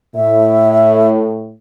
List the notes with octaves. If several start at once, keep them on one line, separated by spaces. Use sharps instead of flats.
A2 E5